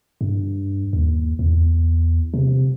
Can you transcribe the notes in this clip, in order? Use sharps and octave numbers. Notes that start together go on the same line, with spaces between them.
G2
D#2
E2
C3